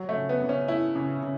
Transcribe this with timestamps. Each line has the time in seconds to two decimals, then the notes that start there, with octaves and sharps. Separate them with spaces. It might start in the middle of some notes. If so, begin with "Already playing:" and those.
Already playing: F#3
0.09 A3
0.15 C#3
0.29 B3
0.42 C#3
0.49 C#4
0.68 A3 E4
0.96 C#3
1.23 C#3